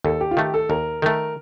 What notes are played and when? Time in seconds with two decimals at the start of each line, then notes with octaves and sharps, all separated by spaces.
0.05 D#2 A4
0.21 G4
0.31 F4
0.37 D#3 A3 G4
0.54 A4
0.70 D#2 A#4
1.02 D#3 A3 A#4